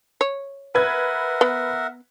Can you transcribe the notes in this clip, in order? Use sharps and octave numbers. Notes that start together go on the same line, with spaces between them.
C#5
A#4 B4 E5 F#5 G#6
B3